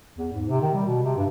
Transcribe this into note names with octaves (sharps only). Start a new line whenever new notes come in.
E2
G#2
C3
D#3
G3
B2
C3
G2